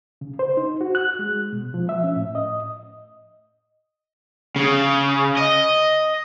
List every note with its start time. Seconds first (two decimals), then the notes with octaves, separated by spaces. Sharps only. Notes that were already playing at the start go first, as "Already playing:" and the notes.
0.21 C#3
0.39 C5
0.57 D#4
0.81 F#4
0.95 F#6
1.19 G#3
1.53 B2
1.74 F3
1.89 E5
2.04 C#4
2.16 A2
2.35 D#5
4.56 C#3
5.37 D#5